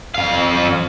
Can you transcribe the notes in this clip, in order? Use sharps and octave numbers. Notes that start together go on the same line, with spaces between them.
F2 F5